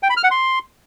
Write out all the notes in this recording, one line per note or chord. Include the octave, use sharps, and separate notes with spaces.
G5
B5
F6
F#5
C6